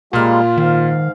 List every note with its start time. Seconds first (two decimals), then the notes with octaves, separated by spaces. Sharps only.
0.13 A#2 G3 G#3 A#3 F4 F6
0.57 G#2 D#3 F5